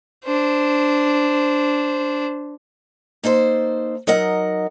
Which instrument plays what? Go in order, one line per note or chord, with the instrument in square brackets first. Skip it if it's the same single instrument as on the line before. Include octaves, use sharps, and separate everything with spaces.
[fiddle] D4 C5
[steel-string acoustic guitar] A#3 D#4 A4 C5
F#3 D#4 A#4 D#5 F#5